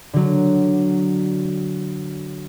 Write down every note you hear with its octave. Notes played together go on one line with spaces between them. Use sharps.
D3 F#3